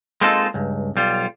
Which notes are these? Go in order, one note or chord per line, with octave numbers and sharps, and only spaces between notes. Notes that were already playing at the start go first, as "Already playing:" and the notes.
G#3 A#3 C4 D#4 F4 A4
C#2 G2
B1 G3 F4